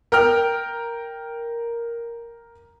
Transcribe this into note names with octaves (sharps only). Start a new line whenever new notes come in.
A#4 G5 F6